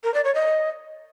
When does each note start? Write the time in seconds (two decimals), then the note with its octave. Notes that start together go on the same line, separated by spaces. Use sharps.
0.04 A#4
0.14 D5
0.24 C#5
0.35 D#5